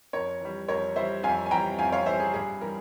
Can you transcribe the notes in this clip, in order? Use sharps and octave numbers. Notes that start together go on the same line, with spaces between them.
F2 A#4 C#5
E3 G3
F2 A#4 C#5
E3 G3 C5 E5
F2 F5 G#5
G#5
E3 G3 G5 A#5
F2 F5 G#5
C#5 F5
E3 G3 C5 E5
G#4
G2 G#4
E3 G3 A#4